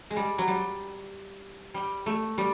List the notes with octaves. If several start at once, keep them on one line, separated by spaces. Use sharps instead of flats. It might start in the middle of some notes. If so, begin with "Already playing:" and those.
G#3
G3
F#3
G3
G3
A3
G3